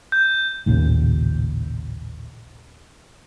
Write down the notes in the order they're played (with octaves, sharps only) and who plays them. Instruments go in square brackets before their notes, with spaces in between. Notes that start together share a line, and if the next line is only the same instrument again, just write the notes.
[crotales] G6
[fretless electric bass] A1 D#2 A#2 C#3